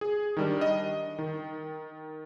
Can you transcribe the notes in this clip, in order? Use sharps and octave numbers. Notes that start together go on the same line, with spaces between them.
G#4
D#3 G3 D4
D#5
D#3